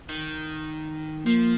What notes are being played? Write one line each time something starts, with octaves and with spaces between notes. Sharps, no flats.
D#3
F3 A#3